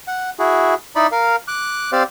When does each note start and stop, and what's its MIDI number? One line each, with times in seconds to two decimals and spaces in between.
0.07 0.30 78
0.39 0.75 64
0.39 0.75 66
0.39 0.75 68
0.96 1.07 63
0.96 1.07 64
0.96 1.07 74
0.96 1.07 83
1.12 1.36 70
1.12 1.36 77
1.48 1.91 86
1.48 1.91 90
1.92 2.03 60
1.92 2.03 67
1.92 2.03 72
1.92 2.03 74
1.92 2.03 77